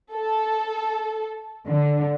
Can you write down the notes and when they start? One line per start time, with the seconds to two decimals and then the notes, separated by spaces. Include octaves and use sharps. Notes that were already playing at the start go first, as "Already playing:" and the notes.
0.12 A4
1.67 D3